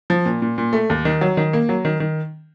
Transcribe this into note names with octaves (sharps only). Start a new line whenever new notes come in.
F3
A#2
A#2
A#2
A3
D#2
D#3
F#3
D#3
A#3
F#3
D#3
D#3